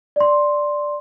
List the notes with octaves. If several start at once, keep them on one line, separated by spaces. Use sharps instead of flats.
D5 C6